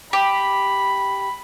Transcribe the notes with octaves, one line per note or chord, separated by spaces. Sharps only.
G4 B5